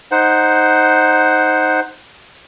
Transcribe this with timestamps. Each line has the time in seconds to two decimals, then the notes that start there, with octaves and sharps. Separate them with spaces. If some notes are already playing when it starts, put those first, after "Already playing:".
0.11 D#4 C5 F#5